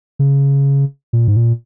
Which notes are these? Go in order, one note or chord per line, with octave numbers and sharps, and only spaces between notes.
C#3
A#2
G#2
A#2